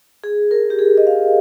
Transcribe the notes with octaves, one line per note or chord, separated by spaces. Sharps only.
G#4
A#4
G4
G#4
D#5
F5